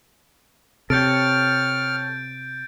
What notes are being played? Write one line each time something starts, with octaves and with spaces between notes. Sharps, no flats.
C3 A4 C#5 G5 F6 G6 A6 D7